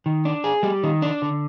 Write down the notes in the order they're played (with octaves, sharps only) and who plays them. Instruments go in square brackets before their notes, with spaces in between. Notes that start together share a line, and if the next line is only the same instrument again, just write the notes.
[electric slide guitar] D#3
D4
G#4
G3
D#3
D4
D3